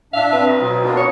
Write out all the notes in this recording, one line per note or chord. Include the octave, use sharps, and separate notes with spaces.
A2 D4 E5 F5
C4 B4
F4 A#4 D#5
B2 F#3 C4 D#4
A#3 B3 D4 F4 F#4
D#4 C#5 C#6